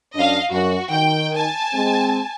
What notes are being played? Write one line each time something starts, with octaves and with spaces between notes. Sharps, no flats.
F#2 C#4 D4 D#5 F5
F#2 F#4
D#3 G5
G#5 A5
G#3 C4